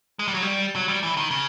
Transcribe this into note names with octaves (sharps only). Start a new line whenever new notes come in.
G#3
G3
F#3
G3
F#3
G3
E3
D#3
C#3